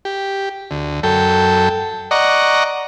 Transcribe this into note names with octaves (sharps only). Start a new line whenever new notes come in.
G4
D2
F#2 A4 G5
D5 D#5 F#5 A#5 C#6